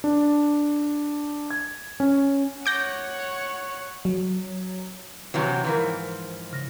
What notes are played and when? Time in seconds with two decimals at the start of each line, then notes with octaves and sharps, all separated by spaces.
0.04 D4
1.51 G#6
2.00 C#4
2.66 C#5 F#5 D6 G6 A#6
4.05 F#3
5.34 C3 E3 F#3 F#5 C#6
5.64 G#2 E3 F3 A#4 A#5
6.53 C#3 A#6